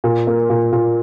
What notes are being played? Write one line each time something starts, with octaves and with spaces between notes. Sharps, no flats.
A#2
A#3
A#2
A#2